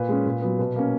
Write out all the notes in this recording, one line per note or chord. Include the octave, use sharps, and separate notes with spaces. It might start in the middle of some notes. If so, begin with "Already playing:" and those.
Already playing: A#2 B4
G#3 C#4
A#2
F#3 B3
B2 B4
A#3 C#4